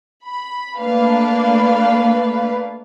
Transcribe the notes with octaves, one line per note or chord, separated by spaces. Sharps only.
B5
A3 A#3 D4 B4 F5